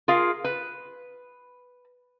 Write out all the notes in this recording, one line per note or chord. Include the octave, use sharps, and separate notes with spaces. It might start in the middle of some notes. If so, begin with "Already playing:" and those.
F4 G#4 A#4 F5
B4